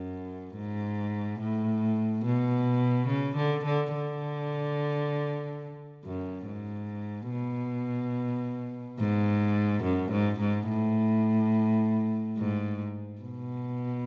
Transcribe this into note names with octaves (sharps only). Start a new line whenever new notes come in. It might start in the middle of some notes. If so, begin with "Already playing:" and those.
Already playing: F#2
G#2
A2
B2
C#3
D3
D3
D3
F#2
G#2
B2
G#2
F#2
G#2
G#2
A2
G#2
B2